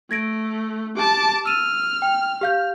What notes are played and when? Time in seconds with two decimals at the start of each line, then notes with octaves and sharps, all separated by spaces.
0.11 A3 G#6 A#6 D7
0.97 G4 A5 D6
1.46 E6 F6 D#7 E7
2.02 G5
2.41 G4 F5 G6